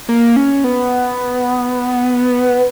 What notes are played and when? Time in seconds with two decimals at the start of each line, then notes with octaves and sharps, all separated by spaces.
0.09 A#3
0.36 C#4
0.64 B3